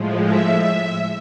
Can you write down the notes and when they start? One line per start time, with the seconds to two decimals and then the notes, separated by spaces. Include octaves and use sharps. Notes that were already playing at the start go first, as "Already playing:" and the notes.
Already playing: A2 F3 G#3
0.22 E5
0.57 E5